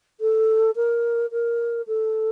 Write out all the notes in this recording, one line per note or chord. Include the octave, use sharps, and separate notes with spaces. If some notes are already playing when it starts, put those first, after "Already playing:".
A4
A#4
A#4
A4